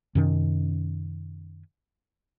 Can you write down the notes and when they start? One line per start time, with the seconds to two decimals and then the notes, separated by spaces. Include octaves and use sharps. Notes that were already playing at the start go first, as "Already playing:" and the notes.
0.15 F#2 C3 D#3 C#4